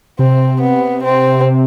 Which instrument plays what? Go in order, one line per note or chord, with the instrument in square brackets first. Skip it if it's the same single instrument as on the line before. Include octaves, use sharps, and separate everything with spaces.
[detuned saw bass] C3 [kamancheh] C4
[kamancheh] B3
C4